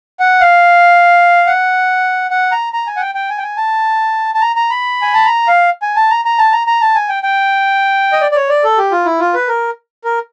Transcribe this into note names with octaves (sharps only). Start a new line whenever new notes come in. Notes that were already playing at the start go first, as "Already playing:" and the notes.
F#5
F5
F#5
F#5
A#5
A#5
G#5
F#5
G5
G5
G#5
G5
G#5
A5
A5
A#5
A#5
B5
G#5
A5
A#5
F5
G#5
A5
A#5
A#5
A5
A#5
A#5
A5
G#5
G5
G5
D#5
D5
D5
C#5
D5
A4
G4
F4
E4
F4
B4
A#4
A#4